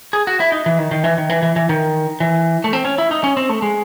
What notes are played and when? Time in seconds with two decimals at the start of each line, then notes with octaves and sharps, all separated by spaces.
0.13 G#4
0.27 F#4
0.40 E4
0.52 D#4
0.66 E3
0.78 D#3
0.91 D#3
1.04 E3
1.18 D#3
1.29 E3
1.42 E3
1.56 E3
1.69 D#3
2.20 E3
2.64 A3
2.73 C4
2.85 C#4
2.98 E4
3.11 D#4
3.24 C#4
3.37 C4
3.49 A3
3.62 G#3